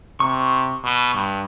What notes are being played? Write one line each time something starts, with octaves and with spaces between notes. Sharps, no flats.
C3 C#6
B2
G2